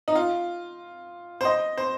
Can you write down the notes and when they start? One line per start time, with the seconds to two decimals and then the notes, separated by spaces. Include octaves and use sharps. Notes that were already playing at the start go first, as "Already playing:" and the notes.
0.08 D#4
0.15 F4
1.41 C5
1.45 D#5
1.77 C5